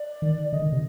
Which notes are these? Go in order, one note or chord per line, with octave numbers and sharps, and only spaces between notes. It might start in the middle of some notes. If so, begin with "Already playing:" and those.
Already playing: D5
D#3
D3 D#5
D#3
C3